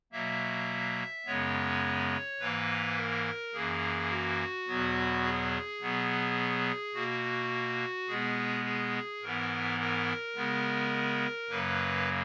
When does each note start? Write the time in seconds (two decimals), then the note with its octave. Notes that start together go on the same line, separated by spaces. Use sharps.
0.12 B2 F#3 A#3 E5
1.26 F#2 C#3 G#3 B3 C#5
2.40 G#2 E3 A#3 B4
2.97 A#4
3.53 F#2 E3 A#3 G#4
4.10 F#4
4.68 E2 B2 F#3 B3
5.25 G#4
5.81 B2 F#3 B3
6.94 B2 A#3 F#4
8.08 B2 G#3 B3 G#4
8.65 G#4
9.22 G#2 E3 B3 A#4
9.79 A#4
10.36 C#3 G#3 B3
11.49 F#2 C#3 F#3 A#3 B4